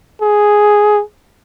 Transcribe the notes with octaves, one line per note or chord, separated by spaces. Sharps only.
G#4